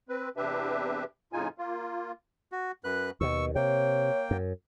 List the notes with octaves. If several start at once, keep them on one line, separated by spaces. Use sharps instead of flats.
C4 B4
E2 C3 D4 G4 B4 E5
F2 A2 C#3 D#4 F4 G#5
A#3 F4
F#4
F#2 B4 F#6
D#2 B2 C#6 E6
C3 A#3 C#5 G5
F#2